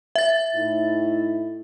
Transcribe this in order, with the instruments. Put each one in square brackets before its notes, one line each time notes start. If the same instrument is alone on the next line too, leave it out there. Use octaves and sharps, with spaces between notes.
[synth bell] E5 A6
[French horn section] A2 D#4 E4